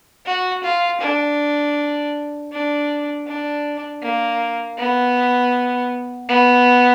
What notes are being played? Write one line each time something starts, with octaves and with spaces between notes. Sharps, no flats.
F#4
F4
D4
D4
D4
A#3
B3
B3